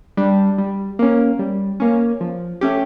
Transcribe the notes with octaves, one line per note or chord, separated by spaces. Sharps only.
G3 D4
G3
A#3 C#4
G3
A#3 C#4
F3
A3 C#4 G4